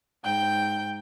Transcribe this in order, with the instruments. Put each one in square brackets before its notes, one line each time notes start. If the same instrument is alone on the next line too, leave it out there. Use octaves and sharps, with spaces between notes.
[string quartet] G#2 G5 G6